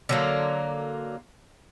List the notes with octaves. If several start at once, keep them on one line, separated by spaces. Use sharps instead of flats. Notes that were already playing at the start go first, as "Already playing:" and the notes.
D3 F#3 A#3